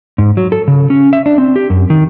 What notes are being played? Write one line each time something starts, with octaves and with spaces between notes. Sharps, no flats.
G#2
F#3
A4
C#3
C#4
E5
D4
C4
G4
F#2
D#3